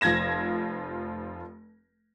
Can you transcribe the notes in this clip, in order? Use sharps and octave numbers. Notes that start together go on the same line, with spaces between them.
F1 F3 F4 G#6 A#6 E7